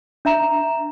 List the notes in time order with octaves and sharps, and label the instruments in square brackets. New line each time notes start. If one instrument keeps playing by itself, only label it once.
[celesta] D4 E5 A#5 E7